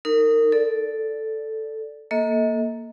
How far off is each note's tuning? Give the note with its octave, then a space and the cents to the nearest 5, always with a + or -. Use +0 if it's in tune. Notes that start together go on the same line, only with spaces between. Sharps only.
D#4 +0 A#4 -30
A4 +0 D5 +0
A#3 +0 A4 +0 D#5 +35